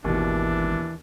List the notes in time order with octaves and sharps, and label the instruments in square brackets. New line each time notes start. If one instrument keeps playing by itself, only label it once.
[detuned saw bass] G#1 [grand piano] D#2 B2 [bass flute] E3 [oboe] D4